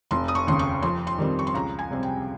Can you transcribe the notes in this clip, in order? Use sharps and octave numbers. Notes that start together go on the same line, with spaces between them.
F1 C6
D#6
C#6
D#2 C#3 C6
C#6
F2 C6
C6
D#3 G3 C4
C#6
C6
C#2 A#5
G#5
C3 G3 C4
G5